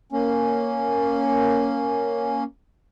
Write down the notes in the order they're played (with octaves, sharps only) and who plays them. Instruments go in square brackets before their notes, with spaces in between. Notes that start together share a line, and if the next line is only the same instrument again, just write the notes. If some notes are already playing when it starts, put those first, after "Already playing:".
[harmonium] A#3 C#4